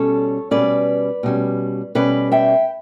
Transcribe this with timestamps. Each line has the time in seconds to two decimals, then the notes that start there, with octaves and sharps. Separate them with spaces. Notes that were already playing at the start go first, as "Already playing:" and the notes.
Already playing: B2 G3 C#4 A4 C#5
0.51 B2 G3 C#4 B4 D5
1.23 B2 G3 C#4
1.95 B2 G3 C#4 B4 D5
2.32 E5 G5